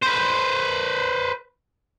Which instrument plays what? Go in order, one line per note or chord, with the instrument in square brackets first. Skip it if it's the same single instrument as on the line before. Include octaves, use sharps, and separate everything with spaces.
[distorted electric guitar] B4 C5